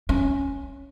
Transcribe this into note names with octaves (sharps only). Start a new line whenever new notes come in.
C#4